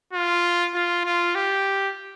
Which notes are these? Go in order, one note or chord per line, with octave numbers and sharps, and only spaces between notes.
F4
F4
F4
G4